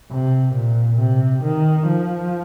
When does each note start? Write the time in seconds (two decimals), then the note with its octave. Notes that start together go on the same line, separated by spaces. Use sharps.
0.12 C3
0.54 A#2
0.99 C3
1.43 D#3
1.87 F3